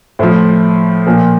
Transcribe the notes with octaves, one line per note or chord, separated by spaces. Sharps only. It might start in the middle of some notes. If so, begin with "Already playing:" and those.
A2 F3 C5
A#2 F3